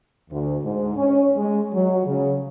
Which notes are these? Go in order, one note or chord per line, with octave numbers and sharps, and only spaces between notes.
D2
G#2
C#4
G#3
F#3
C#3